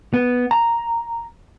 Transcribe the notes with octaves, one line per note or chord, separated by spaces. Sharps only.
B3
A#5